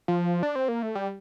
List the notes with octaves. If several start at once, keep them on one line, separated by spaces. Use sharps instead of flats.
F3
D4
C4
A#3
A3
G3